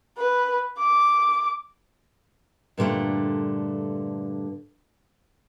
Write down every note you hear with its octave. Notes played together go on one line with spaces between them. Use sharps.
B4
D6
G2 A#2 D3 A3